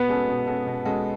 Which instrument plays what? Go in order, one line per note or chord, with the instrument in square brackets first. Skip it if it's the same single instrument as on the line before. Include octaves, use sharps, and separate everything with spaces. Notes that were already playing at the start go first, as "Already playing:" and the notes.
Already playing: [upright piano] B2 [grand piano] B3
[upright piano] G#3 C#4 F#4 A4
B2
G#3 C#4 F#4 A4
B2
G#3 C#4 F#4 A4